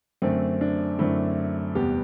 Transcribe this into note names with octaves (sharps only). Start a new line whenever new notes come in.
F#2 D3 A3 C4
D4
F#2 D3 A3 C4 E4
E2 C3 G3 B3 G4